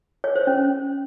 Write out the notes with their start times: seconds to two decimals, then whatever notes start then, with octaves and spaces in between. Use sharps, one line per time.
0.24 C#5
0.36 C5
0.47 C#4